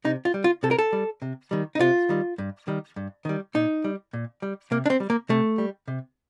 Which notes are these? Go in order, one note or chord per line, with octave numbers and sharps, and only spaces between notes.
C3 D#4
F4
G3
F4
C3 A4
A#4
A4
G3
C3
D#3 G3
D#4
C3 F4
D#3 G3
G2
D#3 G3
G2
D#3 G3
A#2 D#4
G3
A#2
G3
C3 A#3
D4
C4
G3
A#3
C3 A3
G3
C3